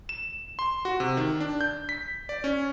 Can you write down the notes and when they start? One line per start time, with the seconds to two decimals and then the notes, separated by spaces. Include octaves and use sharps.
0.09 E7
0.59 C6
0.85 F#4
1.00 C3
1.17 D#3
1.40 D4
1.61 G6
1.89 B6
2.29 D5
2.44 C#4